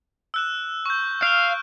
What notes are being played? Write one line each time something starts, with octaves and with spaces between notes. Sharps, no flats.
E6 F#6 E7
C#6 G6
F5 F6 F#6 D7